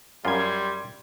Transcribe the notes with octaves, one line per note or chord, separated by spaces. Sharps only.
F#2 G3 F4 C6 G#6